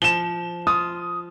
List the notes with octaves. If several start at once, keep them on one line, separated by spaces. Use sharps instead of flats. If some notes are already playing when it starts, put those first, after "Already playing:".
F3 E7 G7
F4 D#6